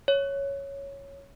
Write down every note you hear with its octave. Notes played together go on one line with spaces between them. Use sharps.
C#5